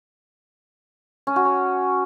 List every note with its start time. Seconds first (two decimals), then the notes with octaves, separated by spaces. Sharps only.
1.27 C#4
1.36 F#4
1.45 C#5